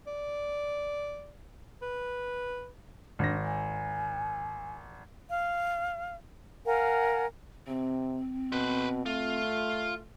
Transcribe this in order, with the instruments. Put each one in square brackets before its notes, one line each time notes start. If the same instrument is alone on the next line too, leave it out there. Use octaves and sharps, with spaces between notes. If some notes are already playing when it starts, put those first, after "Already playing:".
[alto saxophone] D5
B4
[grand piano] G#1 A#6 [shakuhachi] D4
[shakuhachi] G#5
[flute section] F5
A#4 F5 F#5 G#5
[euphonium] C3 [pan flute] C4
[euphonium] B2 [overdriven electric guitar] B4 C5
[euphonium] A3 [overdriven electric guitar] F4